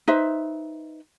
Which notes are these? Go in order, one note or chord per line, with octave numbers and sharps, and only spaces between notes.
D#4 B4 C5 E5